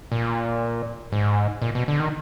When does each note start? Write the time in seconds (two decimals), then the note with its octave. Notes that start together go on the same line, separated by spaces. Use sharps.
0.12 A#2
1.12 G#2
1.62 A#2
1.75 B2
1.88 D3
2.00 D#3